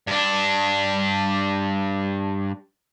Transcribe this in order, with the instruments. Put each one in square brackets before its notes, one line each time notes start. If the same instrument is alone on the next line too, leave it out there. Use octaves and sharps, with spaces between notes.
[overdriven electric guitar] G2 D4